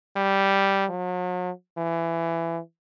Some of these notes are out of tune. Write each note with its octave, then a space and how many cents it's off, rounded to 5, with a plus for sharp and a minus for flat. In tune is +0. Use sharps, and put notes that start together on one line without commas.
G3 -5
F#3 -40
E3 +20